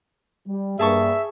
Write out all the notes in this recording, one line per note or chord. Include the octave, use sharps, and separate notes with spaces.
G3
G2 A#3 G#4 E5 A5 C#6